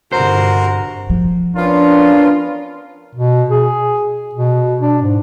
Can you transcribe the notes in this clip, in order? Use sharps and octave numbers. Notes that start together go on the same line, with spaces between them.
G1 C3 F#4 A#4 C5
F3
B3 C#4 D4 F4 A#4
B2
G#4
B2
D4
G#2